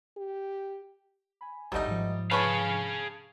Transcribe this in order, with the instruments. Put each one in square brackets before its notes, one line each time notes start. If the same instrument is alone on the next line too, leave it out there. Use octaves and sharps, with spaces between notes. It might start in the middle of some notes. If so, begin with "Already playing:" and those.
[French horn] G4
[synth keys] G#5 B5
[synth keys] G#1 D2 [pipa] F#3 A3 D#4 [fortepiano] G3 D#5
[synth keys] G#2 F3
[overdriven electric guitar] G#4 F5 [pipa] B4 [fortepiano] C#5 A5 C#6